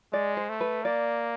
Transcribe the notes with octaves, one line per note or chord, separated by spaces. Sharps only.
G#3 D5
C5
A3
B4
A#3 D5